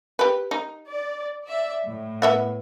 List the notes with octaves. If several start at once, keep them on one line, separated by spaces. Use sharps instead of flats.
G4 B4
D#4
D5
D5 E5
A2
B3 E5 F#5